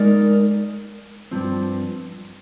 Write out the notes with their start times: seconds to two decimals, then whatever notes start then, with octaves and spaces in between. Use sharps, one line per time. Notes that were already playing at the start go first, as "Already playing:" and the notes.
Already playing: G#3 D#4 A#4 D5
1.31 G2 F3 C4